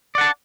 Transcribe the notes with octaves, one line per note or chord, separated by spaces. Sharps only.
D5 F#5 A5